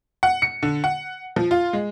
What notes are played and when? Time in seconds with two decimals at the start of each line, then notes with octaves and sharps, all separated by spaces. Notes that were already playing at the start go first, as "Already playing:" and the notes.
0.23 F#5
0.42 C#7
0.63 D3
0.84 F#5
1.36 F3
1.51 F4
1.73 G#3